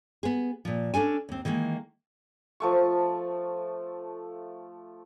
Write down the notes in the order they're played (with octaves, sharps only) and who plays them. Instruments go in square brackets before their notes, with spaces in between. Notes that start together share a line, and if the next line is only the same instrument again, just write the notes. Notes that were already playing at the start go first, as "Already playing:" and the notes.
[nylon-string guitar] B3 G#4
A#2 F3
C#4 D4 A4 G#5
D#2 C4
D#3 E3 G#3 A#3
[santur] F3 A3 C#6